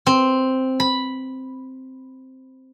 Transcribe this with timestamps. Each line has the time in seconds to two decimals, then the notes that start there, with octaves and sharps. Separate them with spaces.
0.07 C4
0.80 B5